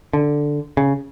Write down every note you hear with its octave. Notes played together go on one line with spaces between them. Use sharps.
D3
C#3